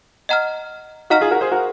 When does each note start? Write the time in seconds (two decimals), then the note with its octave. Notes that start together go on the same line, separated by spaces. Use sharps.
0.29 D#5 F#5 A#5 F6
1.10 D#4 F#4 F5 A#5 F6
1.21 F4 G#4
1.31 F#4 A#4
1.41 G#4 C5
1.52 F#4 A#4